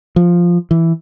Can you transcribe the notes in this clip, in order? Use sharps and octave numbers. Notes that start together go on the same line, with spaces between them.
F3
E3